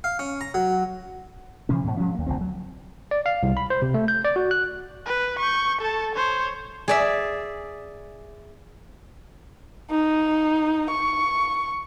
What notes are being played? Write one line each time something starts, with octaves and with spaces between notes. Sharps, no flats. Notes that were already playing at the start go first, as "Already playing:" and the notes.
F5
C#4
A#5
F#3
C3 E3 F3 C#4
G#2 B2
F3 F#3 G#3 C#4
D#2 A#3
F1 D2 F3 C4
F#3
D5
F5
C2
B5
C5
C3
A3
G6
D5
F#4
F#6
B4
C#6 G6
A4 A5
C5 C#5
G#4 D5 E5
D#4
C#6